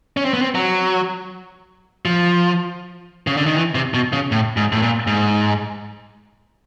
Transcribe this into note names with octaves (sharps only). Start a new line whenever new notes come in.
C#4
C4
B3
C4
F#3
F3
C#3
D3
D#3
E3
C3
B2
C#3
A2
G#2
A2
A#2
G#2